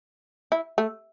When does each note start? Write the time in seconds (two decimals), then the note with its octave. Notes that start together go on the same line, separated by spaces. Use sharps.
0.52 E4
0.78 A3